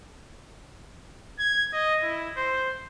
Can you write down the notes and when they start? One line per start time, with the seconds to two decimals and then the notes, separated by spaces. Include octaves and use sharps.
1.39 G#6
1.73 D#5
2.03 E4
2.37 C5